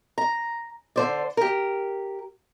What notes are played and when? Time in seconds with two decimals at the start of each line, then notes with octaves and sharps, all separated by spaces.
0.18 A#5
0.96 D3 C5 D5
1.37 G4 A#4